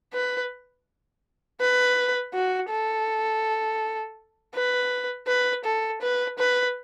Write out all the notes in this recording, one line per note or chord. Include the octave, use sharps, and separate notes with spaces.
B4
B4
F#4
A4
B4
B4
A4
B4
B4